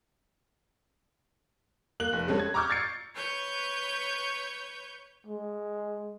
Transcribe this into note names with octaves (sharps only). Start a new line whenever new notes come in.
A#3 F#6 F#7
F1
G3 G#3 C4 C#4 A4
G#6
A#5 C#6 D6 E6 F6 G6
G#6 A6 C7 C#7
B4 C#5 C#6 G6
G#3